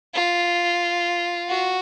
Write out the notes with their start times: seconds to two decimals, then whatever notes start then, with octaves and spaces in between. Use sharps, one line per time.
0.15 F4
1.49 F#4